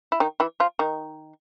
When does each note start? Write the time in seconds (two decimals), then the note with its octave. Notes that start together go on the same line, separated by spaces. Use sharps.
0.12 E4
0.20 D#3 D#4
0.40 E3 E4
0.60 F3 F4
0.79 D#3 D#4